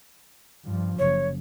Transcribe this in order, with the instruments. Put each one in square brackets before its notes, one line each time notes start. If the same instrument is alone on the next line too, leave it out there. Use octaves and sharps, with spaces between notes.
[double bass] G2 F3
[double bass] F#1 [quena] C#5